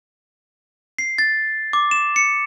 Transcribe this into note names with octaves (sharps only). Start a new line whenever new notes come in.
C7
A6
D6
E7
C#7